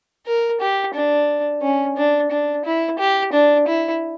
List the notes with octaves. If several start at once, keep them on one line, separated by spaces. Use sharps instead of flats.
A#4
G4
D4
C#4
D4
D4
E4
G4
D4
E4